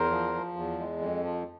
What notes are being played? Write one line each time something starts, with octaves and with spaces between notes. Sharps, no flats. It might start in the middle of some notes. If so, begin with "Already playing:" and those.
Already playing: E2 A#4 C5
F3
F3
E2
G#3
F2
F3